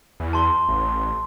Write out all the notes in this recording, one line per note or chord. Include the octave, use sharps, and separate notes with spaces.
E2
A5 C6 G7
A1